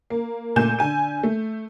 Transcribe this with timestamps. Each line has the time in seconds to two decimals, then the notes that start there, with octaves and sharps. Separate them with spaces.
0.10 A#3
0.56 A#2 A3 A#3 G#5 G6 E7
0.79 D3 G#5 D#7
1.23 A3